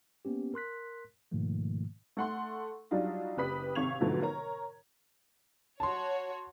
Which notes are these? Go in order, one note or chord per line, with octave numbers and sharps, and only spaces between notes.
A#3 B3 C#4 G4
A#4 C6 F#6 B6
G#2 B2 D#3 F3 A3 A#3
A3 F#5 C6
F#3 G3 D4 D#4 F4
F#1 G4 B4 B5 D#6 B6
G#1 C3 F5 C#6 G#6 F7
G#2 B2 D3 F3 F#3 A3
A#4 C#5 A#5
F#4 C#5 A5 C6